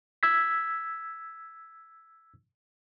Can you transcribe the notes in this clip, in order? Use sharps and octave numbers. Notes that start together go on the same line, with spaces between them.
E6 G#6 B6